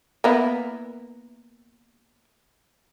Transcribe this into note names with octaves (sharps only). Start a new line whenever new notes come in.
A#3 B3 E4